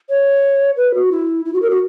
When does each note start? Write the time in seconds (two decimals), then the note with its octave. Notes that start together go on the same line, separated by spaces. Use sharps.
0.10 C#5
0.77 B4
0.94 F#4
1.12 E4
1.45 E4
1.54 F#4
1.62 A#4
1.70 F#4